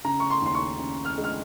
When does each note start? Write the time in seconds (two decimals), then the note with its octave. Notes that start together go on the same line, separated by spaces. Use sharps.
0.05 C#3 A#5
0.20 C#6
0.30 C6
0.42 D#2 C6
0.54 C#6
0.79 C#3
1.05 F6
1.18 G#3
1.24 F6